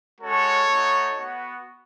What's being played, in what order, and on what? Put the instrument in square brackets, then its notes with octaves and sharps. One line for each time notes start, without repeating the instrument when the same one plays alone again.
[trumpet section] G#3 C#4 F#4 A4 C#5
A3 D#4 F#4
B3 F#4